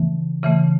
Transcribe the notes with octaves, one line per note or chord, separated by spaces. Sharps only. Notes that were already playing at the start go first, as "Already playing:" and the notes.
Already playing: C#3 E3 A3
C#3 E3 A3